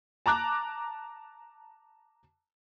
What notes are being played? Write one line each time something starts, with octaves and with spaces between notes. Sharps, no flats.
A5 A#5 D6 F#6